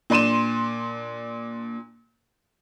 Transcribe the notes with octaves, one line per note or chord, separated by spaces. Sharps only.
A#2 D4 C6 D#7 E7